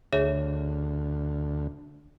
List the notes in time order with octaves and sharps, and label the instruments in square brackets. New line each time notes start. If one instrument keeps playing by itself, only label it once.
[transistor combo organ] D2 [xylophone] G#4 C#5 E5